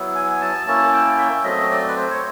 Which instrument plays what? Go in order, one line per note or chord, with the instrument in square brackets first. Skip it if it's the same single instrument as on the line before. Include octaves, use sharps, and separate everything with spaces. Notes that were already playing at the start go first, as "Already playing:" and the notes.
Already playing: [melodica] F#3 B3 E4
G#5
A5
A#3 C#4 E4 A5
G5
E5
F#3 A3 C4 D#5
D5
B4
C5
C#5